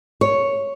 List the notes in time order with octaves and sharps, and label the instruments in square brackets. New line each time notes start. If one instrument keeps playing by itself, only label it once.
[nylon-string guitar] C#5